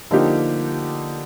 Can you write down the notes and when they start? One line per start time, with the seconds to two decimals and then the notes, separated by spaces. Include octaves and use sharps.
0.11 D3 F3 A#3 D#4 G4